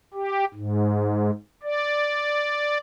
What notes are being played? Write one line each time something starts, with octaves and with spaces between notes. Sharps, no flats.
G4
G#2
D5